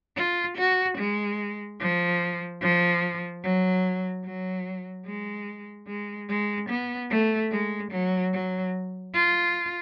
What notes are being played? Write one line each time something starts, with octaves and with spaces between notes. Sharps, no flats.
F4
F#4
G#3
F3
F3
F#3
F#3
G#3
G#3
G#3
B3
A3
G#3
F#3
F#3
F4